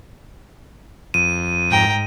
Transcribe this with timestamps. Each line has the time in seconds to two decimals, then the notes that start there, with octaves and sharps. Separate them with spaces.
1.14 F2 D#7
1.71 G#2 G5 A#5